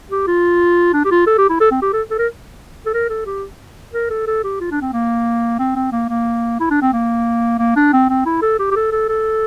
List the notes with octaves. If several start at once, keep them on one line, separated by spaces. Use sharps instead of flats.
G4
F4
D4
G4
F4
A4
G4
E4
A4
C4
G4
A4
A4
A#4
A4
A#4
A4
G4
A#4
A4
A4
G4
F4
D4
C4
A#3
C4
C4
A#3
A#3
E4
D4
C4
A#3
A#3
D4
C4
C4
E4
A4
G4
G4
A4
A4
A4